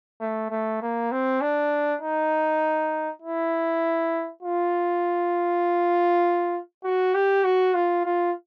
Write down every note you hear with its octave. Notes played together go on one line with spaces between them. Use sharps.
A3
A3
A#3
C4
D4
D#4
E4
F4
F#4
G4
F#4
F4
F4